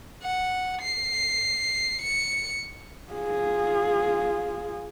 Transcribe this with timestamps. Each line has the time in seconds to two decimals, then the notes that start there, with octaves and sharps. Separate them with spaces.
0.22 F#5
0.82 C7
2.02 C#7
3.13 F4 G#4